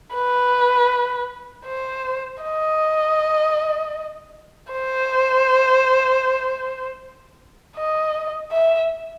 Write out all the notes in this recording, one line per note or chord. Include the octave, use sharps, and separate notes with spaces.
B4
C5
D#5
C5
D#5
E5